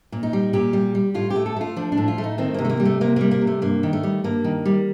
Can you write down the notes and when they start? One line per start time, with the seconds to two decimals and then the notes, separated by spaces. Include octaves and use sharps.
0.12 A#2
0.23 D#4
0.33 G3
0.53 A#2 G4
0.73 G3
0.95 G3
1.14 A2 F4
1.30 G4
1.36 A3
1.46 A4
1.56 A3 F4
1.76 F3 D4
1.92 D4
1.97 A2
2.08 F4
2.18 A3
2.24 D#4
2.38 D#3 C4
2.54 C3 A#3
2.65 A3
2.70 A#3
2.80 G3
2.85 A3
3.01 C3 A#3
3.16 G3 A#3
3.31 A#3
3.42 C3
3.47 A3
3.62 G2 A#3
3.83 D#3
3.93 A3
4.03 G3
4.24 G2 A#3
4.44 D#3
4.66 G3